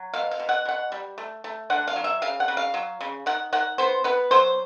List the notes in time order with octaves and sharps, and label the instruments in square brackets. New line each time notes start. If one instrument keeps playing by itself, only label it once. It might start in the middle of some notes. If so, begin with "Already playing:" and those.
Already playing: [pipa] F#3
B2 F5
F5
B2
F#5
B2 F#5
G3
A3
A3
D3 F#5
F5
F#3
E5
C#3 F5
F#5
C#3
F5
F#3
C#3
D#3 F#5
D#3 F#5
B3 C5
B3 B4
F#3 C5